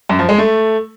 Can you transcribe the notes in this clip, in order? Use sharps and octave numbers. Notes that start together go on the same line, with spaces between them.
F#2
F3
G#3
A3